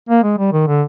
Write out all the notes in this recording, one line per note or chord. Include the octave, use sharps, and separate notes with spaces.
A#3
G#3
G3
D#3
D3